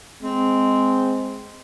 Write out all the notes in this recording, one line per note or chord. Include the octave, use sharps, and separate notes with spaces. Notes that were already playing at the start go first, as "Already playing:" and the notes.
G#3 C4